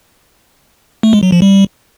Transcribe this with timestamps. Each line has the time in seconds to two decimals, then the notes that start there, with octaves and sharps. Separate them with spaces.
1.03 A3
1.13 G#3
1.23 F#3
1.32 F3
1.42 G3